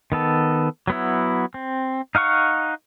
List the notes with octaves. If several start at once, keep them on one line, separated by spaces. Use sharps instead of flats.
D#3 B3 A4
F#3 B3 E4
C4
D#4 F5 F#5 C#6